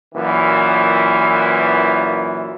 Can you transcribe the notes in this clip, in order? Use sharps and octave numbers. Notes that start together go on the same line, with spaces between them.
F#2 A#2 E3